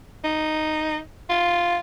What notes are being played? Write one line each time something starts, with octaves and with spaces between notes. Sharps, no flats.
D#4
F4